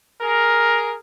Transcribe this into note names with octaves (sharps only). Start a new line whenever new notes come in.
G#4 A#4